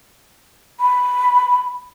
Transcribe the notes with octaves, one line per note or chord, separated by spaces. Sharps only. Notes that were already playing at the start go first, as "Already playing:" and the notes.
B5